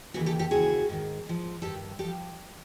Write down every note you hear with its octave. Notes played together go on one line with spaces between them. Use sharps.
D#2 C#3 E3 F#4 G#4
G4 A4
G4 A4
D#2 C#3 E3 F#4 G#4
G#2 D#3
G#2 F3
G2 D#3 G4 A4
F3 G4 A4